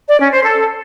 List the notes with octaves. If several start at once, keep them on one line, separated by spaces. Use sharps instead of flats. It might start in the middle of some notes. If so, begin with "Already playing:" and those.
D5
C#4
C5
A4